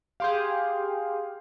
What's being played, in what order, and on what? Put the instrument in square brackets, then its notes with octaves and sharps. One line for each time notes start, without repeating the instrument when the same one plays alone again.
[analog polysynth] G4 G#4 [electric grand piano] F5 C6 G6